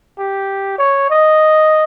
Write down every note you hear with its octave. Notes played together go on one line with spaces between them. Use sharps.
G4
C#5
D#5